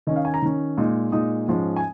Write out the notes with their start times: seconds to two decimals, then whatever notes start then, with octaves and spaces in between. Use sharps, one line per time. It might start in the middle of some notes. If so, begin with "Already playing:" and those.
0.07 D#3 C#4 D#5
0.16 F5
0.25 G#5
0.34 A#5
0.42 D#3 C#4
0.78 A#2 G#3 D#4
1.12 A#2 G#3 D#4 D#6
1.48 G#2 F3 G#3 C#4
1.76 G#5